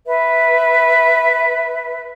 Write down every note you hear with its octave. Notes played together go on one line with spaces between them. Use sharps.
B4 E5